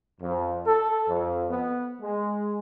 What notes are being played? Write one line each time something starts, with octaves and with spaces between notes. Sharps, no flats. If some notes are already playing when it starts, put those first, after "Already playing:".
F2
A4
F2
B3
G#3